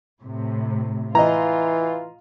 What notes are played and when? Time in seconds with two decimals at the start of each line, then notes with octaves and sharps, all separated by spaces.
0.22 A2 C3
1.15 E3 F4 D#5 A#5